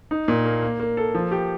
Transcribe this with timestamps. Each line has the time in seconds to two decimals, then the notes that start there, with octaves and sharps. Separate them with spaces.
0.11 D#4
0.28 A#2
0.45 A#3
0.63 A#3
0.80 A#3
0.97 A4
1.15 F3
1.32 G4